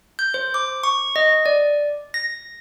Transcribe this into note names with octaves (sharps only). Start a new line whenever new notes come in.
G6
C5
D6
C#6
D#5
D5
A#6